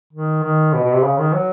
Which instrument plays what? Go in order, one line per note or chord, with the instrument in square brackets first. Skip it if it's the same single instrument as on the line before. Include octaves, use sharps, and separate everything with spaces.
[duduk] D#3
D#3
B2
B2
C3
C#3
D#3
F#3